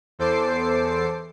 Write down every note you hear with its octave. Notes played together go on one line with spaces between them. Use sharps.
E2 A4 C5 D6 C7